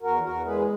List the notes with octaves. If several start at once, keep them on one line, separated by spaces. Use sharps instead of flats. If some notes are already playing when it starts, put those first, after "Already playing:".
E2 F#4 A#4
E2 F#4 A#4
G#3 G#4 B4